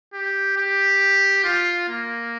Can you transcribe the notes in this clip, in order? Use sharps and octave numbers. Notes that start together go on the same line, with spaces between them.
G4
G4
F4
A#3